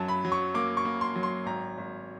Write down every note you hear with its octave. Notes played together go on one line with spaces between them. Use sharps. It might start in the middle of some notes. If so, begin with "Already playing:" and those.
Already playing: F#2 F#3 A5
B5
F#3
C#6
A#3 D6
C#6
A#3
C6
F#3
C6
G#1 A#5
G#1